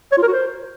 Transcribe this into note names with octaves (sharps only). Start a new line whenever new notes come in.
C#5
F4
A#4
F#4
C5